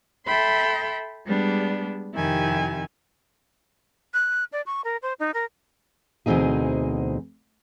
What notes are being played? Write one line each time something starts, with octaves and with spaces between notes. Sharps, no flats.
A4 E5 G5 B5 C6
G3 G#3 B3 D4
F2 C3 D#3 E4 G4 G#5
F#6
D5
C#6
A#4
C5
D#4
A#4
D2 B2 E3 C4 D#4 G#4